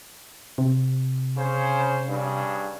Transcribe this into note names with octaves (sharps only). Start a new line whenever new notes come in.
C3
C#3 C#4 C5
G2 C#3